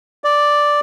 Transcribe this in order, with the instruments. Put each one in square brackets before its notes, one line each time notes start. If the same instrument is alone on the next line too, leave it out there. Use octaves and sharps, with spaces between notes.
[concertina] D5